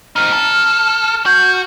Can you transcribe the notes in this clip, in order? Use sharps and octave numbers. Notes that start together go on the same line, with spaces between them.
C4 D#4 F6
A4
F#4 G6